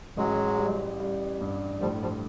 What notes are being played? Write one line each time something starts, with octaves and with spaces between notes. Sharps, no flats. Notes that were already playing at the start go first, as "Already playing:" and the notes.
A1 F#3 G#3
G3
G3
G2
A2 F3 G3
F3 G3